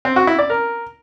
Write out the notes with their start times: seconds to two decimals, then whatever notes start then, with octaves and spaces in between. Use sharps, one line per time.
0.05 C4
0.16 F#4
0.27 E4
0.39 D5
0.50 A#4